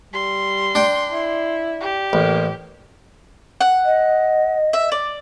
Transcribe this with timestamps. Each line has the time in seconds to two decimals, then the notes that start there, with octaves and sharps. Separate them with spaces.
0.13 G3 C6
0.75 D4 G5
1.10 E4
1.81 G4
2.13 A1 A#3
3.61 F#5
3.85 D#5
4.73 E5
4.92 D5